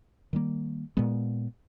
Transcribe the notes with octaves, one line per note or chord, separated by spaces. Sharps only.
D#3 G3 A#3
A#2 G#3 B3